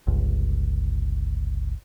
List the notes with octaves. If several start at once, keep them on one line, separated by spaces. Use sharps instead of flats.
G1 C#2